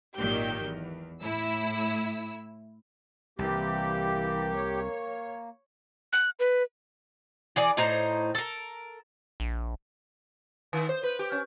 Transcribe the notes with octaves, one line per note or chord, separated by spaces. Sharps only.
G#1 A#2 D#3 F#3 G4 G6
E2
A2 E4 E6
C2 E3 A#3 G4
C#5
F#6
B4
E3 G#4 D5
A2 D#4 C5 A#5
A4 A#4
A#1
D#3
C5
B4
G4
C#4